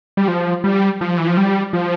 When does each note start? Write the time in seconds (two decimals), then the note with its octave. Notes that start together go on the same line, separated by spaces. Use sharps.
0.17 G3
0.28 F3
0.64 G3
1.01 F3
1.18 E3
1.27 F3
1.37 G3
1.73 F3